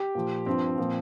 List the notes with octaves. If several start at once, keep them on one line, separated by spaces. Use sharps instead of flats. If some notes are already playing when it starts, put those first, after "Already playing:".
Already playing: G4
A#2 F3
G2 F3 C4
A#2 F3